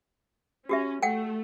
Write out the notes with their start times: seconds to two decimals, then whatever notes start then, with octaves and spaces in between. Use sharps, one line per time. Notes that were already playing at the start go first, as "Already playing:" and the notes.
0.69 C#4 F#4 G4 E5
1.03 A3 F#5 G5